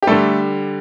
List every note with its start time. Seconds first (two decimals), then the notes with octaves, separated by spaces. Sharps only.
0.02 G4
0.07 D3 G3 A3 A4